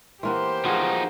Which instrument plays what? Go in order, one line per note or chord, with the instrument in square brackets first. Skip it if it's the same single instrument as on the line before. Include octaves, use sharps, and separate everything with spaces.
[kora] E3 A#3 B3 [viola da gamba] G4 C5 [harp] C6
[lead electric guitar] F3 D#4 [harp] F#4 G#4 F5